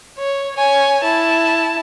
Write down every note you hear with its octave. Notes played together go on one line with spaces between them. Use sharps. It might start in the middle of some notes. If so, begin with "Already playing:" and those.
C#5
C#5 G#5
E4 A5